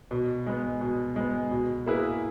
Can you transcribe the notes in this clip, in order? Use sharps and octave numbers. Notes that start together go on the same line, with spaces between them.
B2
G#3 B3
B2
G#3 B3
B2
A#3 E4 G#4 B4